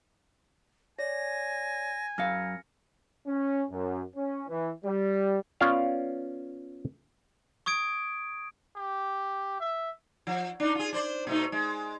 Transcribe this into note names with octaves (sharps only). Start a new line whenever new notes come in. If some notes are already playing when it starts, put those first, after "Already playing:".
C#5 D5 G#5 A#6
F#2 F5 F6 A#6 C#7
C#4
F#2
C#4
E3
G3
B3 C#4 F4 C#5 D5 F5
C#6 D#6 G#6 D7
G4
E5
F3
D4 D#4
F4 G#4
D4 C5 D5
B2 A3 D#4
G#3